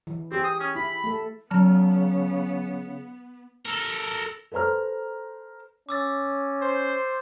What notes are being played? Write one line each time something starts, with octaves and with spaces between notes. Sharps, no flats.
E3
C4 G4 G#4
D#6
C#4
E4 B5
A3 A4
C#3 F#3 B3 A5 F6
A4 A#4
A4 B4 C5 A#5 F6
C#4 D6 E6 A6
C5